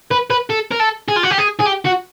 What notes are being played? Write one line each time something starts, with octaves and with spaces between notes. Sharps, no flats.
B4
B4
A4
A#4
A4
G#4
F4
F#4
G4
G#4
G#4
G4
F#4